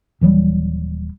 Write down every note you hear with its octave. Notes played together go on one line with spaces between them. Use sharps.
D#1 E3 F#3 G3